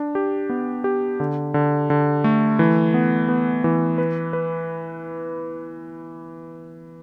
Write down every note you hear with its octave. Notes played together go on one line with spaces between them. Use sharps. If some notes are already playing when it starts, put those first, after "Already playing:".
Already playing: D4
G4
B3
G4
D3
D3
D3
A3
E3
B3
B3
E3
B4
B4